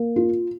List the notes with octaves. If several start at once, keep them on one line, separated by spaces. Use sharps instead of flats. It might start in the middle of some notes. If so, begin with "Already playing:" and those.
Already playing: A#3
F4